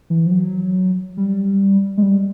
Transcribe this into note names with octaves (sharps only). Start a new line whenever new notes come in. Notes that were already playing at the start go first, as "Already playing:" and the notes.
E3
F3
F#3
G3
G#3
G3